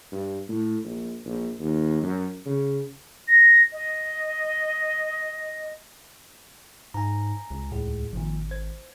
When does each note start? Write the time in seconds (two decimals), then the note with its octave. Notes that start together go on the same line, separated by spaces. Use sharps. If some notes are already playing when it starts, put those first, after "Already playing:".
0.12 G2
0.49 A2
0.84 A#1
1.25 A#1
1.59 D#2
2.03 F#2
2.46 C#3
3.28 A#6
3.72 D#5
6.94 G#2 G#5 A#5
7.50 C#2
7.72 D#2 A2 G#4
8.13 G#1 A#2 D#3 F3
8.51 C5 G#6